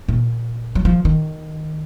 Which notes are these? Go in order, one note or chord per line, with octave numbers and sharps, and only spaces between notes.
A#2
F#3
F3
D#3